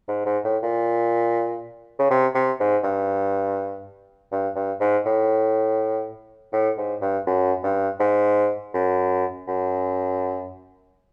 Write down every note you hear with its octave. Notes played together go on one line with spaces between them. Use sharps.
G#2
G#2
A2
A#2
C#3
C3
C3
G#2
G2
G2
G2
G#2
A2
A2
G#2
G2
F#2
G2
G#2
F#2
F#2